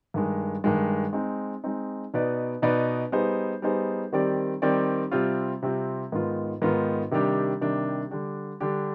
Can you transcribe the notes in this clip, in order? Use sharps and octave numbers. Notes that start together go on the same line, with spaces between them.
G2 D#3 G#3
G2 D#3 G#3
G#3 C4 D#4
G#3 C4 D#4
B2 B3 D#4 B4 D5
B2 B3 D#4 B4 D5
G3 B3 D#4 G#4 C5
G3 B3 D#4 G#4 C5
D#3 G3 C4 G4 D5
D#3 G3 C4 G4 D5
C3 G3 C4 F4
C3 G3 C4 F4
G#2 D#3 B3 F4
G#2 D#3 B3 F4
C3 D#3 G3 D4 G4
C3 D#3 G3 D4 G4
D3 G3 D4 G4
D3 G3 D4 G4